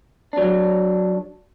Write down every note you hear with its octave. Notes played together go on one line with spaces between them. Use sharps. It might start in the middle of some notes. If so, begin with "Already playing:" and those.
F#3 D4